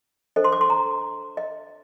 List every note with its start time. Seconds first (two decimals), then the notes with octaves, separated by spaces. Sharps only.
0.36 D4 A4 C5 D#5
0.44 C6
0.52 D6
0.61 C6
0.70 A#5
1.37 D#5